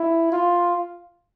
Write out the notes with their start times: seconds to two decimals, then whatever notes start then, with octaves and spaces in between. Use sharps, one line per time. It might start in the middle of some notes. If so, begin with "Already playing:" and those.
Already playing: E4
0.32 F4